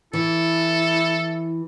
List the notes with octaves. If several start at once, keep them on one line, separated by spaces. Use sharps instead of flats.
E3 E4 A4